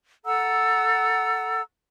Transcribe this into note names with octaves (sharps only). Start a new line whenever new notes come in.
A4 F#5 A#5 E6